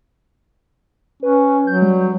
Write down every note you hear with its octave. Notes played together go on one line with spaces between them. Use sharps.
C#4 B4
F#3 G6
G3